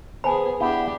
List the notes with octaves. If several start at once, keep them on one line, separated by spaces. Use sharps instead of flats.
B3 G#4 C5 G#5 A5 B5
B3 D4 E4 G4